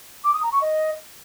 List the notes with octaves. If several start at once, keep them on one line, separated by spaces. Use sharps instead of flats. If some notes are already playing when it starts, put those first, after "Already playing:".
D6
D#6
A#5
C#6
D#5